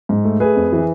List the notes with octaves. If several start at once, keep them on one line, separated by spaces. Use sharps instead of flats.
G#2
A3
A3 G#4 B4
F2
E3